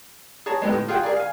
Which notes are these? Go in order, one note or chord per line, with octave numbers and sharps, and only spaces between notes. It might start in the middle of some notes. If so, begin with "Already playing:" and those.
G#4 C#5 A5 A#5
G#3 B3 D#4 G4 A4
A2
F4 G#4 F#5 G5
G#4 A#4 D5
F5 G#5